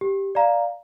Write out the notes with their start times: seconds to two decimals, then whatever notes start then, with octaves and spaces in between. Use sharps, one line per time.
0.01 G4
0.35 D5 F5 A#5